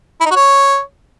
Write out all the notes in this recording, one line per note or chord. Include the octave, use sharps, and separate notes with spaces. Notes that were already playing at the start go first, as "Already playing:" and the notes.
E4
D#4
F#4
C#5